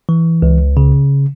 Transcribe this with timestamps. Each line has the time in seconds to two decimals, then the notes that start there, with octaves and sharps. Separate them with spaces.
0.09 E3
0.42 C#2
0.77 C#3